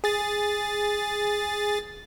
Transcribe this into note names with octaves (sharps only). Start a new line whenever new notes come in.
G#4 A6